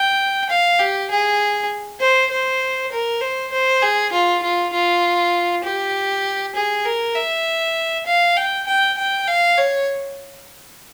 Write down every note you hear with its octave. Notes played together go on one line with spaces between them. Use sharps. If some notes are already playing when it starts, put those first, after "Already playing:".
Already playing: G5
F5
G4
G#4
C5
C5
A#4
C5
C5
G#4
F4
F4
F4
G4
G#4
A#4
E5
F5
G5
G5
G5
F5
C#5